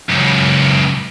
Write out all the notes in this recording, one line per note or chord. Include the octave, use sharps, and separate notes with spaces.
C#2 F#2